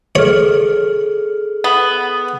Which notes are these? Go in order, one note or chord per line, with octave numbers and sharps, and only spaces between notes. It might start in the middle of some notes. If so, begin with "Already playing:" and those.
G#4 A4 C#5 F6
B3